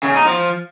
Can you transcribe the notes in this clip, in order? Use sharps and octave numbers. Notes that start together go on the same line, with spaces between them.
C#3
D#4
F3